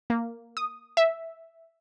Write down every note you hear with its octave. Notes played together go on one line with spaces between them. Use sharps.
A#3
D#6
E5